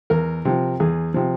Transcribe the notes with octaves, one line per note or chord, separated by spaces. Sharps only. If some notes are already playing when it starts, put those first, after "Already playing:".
E2 A#4
C3 F3
E2 G#4
C3 F3